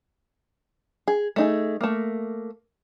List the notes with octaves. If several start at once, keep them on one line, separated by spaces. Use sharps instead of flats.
G#4
A3 D#4 G#4
A3 A#3